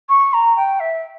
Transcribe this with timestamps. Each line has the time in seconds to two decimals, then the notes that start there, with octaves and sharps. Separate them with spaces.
0.09 C#6
0.33 A#5
0.57 G5
0.80 E5